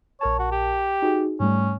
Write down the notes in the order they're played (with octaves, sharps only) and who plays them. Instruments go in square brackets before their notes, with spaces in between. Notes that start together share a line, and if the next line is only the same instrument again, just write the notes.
[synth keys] A#1 A#4 A5 [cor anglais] C#5
[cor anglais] F#4
G4
[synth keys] D#4 F#4 G#4
[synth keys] G#2 G3 A3 [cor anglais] C#4